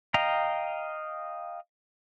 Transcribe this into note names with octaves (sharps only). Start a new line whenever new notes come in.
D#5 F5 G5 A#5